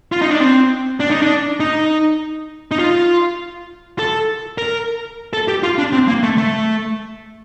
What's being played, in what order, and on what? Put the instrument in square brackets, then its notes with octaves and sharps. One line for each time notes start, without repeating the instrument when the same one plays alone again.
[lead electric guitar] F4
D#4
D4
C4
D4
D#4
D4
D#4
D#4
F4
A4
A#4
A4
G4
F4
D4
C4
A#3
A3
A3